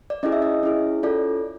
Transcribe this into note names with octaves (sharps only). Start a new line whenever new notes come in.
D5
C#4 E4 G#4 D#5
E5
D#5
C#4 E4 G#4
C#4 F4 A4 D5